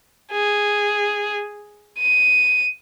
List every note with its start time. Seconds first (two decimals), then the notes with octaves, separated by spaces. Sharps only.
0.31 G#4
1.99 D#7